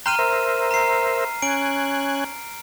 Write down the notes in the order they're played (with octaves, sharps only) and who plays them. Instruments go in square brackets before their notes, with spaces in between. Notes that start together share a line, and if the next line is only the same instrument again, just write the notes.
[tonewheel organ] G5 C6 F#6 [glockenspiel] A#5 F6 D#7
[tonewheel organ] A#4 C5 E5
[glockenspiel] A#5 C7
[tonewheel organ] C#4 G#5 F#6 [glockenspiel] D7